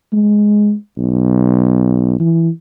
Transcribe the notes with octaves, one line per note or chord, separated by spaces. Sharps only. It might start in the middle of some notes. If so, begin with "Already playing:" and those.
G#3
B1
E3